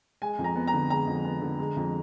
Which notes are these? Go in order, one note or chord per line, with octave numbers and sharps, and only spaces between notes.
G#3 G#5
F2
A#5
B3
A#5
D3
G#3 A#5
F2
B3
D3
G#3
F2